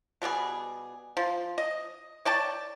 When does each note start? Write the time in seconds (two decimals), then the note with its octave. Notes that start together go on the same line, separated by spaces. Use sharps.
0.22 B2 G3 B3 G#4
1.17 F3
1.58 D#5
2.25 C#5 D5 G5 A5